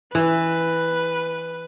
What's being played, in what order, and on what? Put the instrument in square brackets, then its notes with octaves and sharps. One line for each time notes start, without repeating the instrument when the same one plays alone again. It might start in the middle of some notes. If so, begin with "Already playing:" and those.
[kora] E3 [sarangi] B4